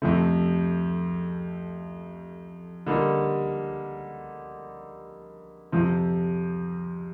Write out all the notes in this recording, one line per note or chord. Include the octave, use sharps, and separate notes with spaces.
F2 C3 F3 A3 C4
D3 G3 A#3 D#4
F2 C3 F3 C4